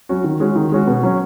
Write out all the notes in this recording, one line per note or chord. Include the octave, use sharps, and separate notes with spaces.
F#3 C#4 F#4
D#3
G#3 C#4 F#4
D#3
G#3 C#4 F#4
B2
F#3 C#4